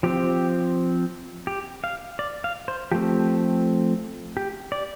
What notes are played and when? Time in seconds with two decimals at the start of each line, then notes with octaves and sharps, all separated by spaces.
0.03 F3 C4 G4
1.47 G4
1.84 F5
2.19 D5
2.44 F5
2.68 C5
2.92 F3 A3 C4 G4
4.37 G4
4.72 D5